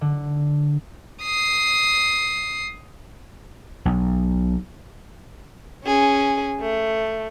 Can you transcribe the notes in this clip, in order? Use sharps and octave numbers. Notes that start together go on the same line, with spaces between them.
D3
D#6 C7
B1
C#4 G#4
A3